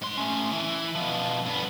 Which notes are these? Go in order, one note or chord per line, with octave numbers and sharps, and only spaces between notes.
G#2 C6
A3 C#4
E3
B2 F3
G2 B3